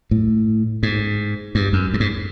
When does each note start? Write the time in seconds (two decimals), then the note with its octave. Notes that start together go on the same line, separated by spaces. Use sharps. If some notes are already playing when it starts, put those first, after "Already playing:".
0.11 A2
0.83 G#2
1.55 G2
1.73 F#2
1.94 G2
2.00 G#2